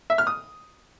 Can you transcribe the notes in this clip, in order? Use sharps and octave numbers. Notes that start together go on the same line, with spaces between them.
E5
F6
D#6